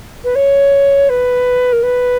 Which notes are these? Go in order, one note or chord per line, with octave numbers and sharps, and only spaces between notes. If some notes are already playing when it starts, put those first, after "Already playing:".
B4
C#5
B4
A#4
B4